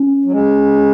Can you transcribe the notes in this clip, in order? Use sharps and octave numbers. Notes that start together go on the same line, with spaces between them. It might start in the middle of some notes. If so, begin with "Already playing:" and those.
Already playing: C#4
F#3
G#3